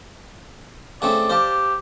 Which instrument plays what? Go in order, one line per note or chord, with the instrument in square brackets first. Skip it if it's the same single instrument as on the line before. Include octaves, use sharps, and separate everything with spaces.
[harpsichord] C#3 A3 C4 [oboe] D5
[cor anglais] G4 [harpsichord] C5 F5 A5